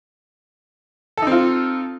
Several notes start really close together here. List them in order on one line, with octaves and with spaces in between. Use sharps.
A4 D#4 C4 F4